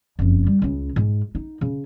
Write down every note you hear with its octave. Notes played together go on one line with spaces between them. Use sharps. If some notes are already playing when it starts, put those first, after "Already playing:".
F#1 F2
G3
C#2 C#3
G#2
D#4
C#3